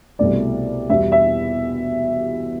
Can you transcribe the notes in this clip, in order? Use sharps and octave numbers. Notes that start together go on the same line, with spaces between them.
C2 B2 A3 D5
E2 B2 G3 E5
E5